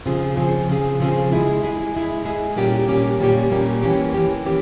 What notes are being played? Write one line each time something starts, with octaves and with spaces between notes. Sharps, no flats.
C#3 F3 C4 F4 G#4
C#3 F3 C4 F4 G#4
C#3 F3 C4 F4 G#4
C#3 F3 C4 F4 G#4
G#3 E4 G#4
G#3 E4 G#4
G#3 E4 G#4
G#3 E4 G#4
A#2 G3 A#3 C#4 G4
A#2 G3 A#3 C#4 G4
A#2 G3 A#3 C#4 G4
A#2 G3 A#3 C#4 G4
E3 A#3 C#4 G4
E3 A#3 C#4 G4
E3 A#3 C#4 G4